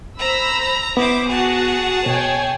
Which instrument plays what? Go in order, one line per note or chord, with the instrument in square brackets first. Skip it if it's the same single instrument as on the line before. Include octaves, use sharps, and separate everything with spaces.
[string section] C5 B5 E6 [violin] A#5
[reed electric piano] B3 [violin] E4 C5 [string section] D6
[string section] F#4 F#5 [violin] G#4 A5
[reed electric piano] B2 [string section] C#5 G5 G#5